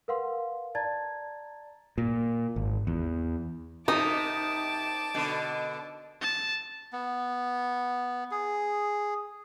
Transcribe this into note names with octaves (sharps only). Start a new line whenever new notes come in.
A#4 B4 F5 F#5 C6
D5 A5 A#5 G#6 A6
A#2
G#1
E2
C3 D#4 A5 D6 D#6
B2 D3
A5
B3
G#4